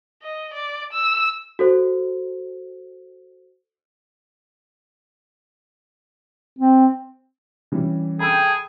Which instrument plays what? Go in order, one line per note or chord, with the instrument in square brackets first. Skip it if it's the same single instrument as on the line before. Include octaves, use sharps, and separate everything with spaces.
[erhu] D#5
D5
E6
[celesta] F#4 A4 C5
[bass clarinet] C4
[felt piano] E3 G3 C#4
[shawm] G#4 [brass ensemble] A4 G5 [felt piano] B5 E6